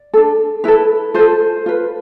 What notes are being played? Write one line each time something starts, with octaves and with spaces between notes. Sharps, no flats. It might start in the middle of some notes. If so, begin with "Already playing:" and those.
Already playing: D5
D4 A4
E4 A4 B4
F4 A4 C5
F4 B4